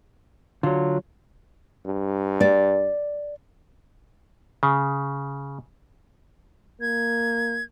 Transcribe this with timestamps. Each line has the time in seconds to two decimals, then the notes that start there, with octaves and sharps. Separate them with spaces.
0.63 D3 F#3 F4
1.85 G2
2.41 D5
4.63 C#3
6.81 A#3 G#6